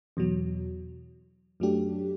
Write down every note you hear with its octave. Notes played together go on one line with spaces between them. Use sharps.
E2 B2 F#3
F#2 F#3 A3 D4 G4